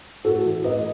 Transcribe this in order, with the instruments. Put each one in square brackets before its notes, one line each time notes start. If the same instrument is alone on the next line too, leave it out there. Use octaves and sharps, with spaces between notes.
[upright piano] A2 F#4 A4
E3
A2 B4 D#5